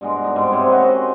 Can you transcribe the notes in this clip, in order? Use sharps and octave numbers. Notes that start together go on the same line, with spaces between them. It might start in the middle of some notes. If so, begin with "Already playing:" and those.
G2 B2 G#3
D#4
G#2 G3 C4
G#2 C3 C5 C#5
F#4 G4 A#4 B4
C4 C#4 C5 D#5